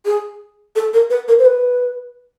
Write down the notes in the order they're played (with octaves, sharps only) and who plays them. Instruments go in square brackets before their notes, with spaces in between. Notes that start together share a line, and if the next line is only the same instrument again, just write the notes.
[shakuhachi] G#4
A4
A#4
B4
A#4
C5
B4